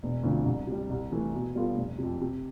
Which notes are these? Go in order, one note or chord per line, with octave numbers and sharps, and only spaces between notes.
E1
D2 D3 F3 C4
C2
C3 G3
C2
C3 E3 A3
B2
G3 B3 F4 A4
F1
F2 C3
C3